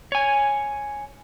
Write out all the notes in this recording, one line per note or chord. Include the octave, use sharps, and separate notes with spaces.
C#5 G#5